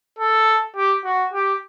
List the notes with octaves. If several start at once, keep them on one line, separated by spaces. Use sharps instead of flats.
A4
G4
F#4
G4